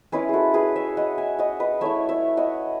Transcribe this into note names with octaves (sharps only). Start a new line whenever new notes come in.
G#3 C#4 E4 G#4 B4
F#4 G#4 A4
G#4 B4
C#5 E5
D#5 F#5
E5 G#5
D#5 F#5
B4 D#5
A3 E4 C#5 E5
C#5 E5
D#5 F#5